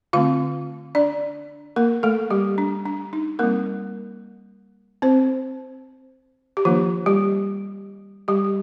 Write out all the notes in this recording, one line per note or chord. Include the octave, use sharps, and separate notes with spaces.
D3 A3 C4 F4 F5
D4 D5
A#3 A#4
A3 A4
G3 G4
D4
D4
D#4
G3 A#3 C4 A#4
C4 C5
G4
D#3 F3 A#3 D4 F4
G3 G4
G3 G4